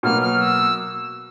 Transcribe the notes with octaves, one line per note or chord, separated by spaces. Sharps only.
B2 F#3 A#3 F6
F6
E6